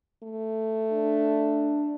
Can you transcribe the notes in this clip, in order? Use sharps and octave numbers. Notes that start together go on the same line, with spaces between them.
A3
D4